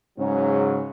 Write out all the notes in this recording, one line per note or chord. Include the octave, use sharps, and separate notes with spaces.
G#2 C#3 F#3 C#4